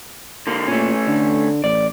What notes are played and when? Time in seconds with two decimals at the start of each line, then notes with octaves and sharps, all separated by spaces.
0.47 D3 A#3
0.68 A#2 A3 C#4
1.07 D3
1.64 A1 D5